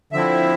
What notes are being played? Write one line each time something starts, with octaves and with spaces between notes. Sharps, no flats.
D3 F3 C4 E4 E5